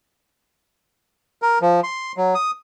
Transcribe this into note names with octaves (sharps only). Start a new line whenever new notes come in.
A#4
F3
C6
F#3
D#6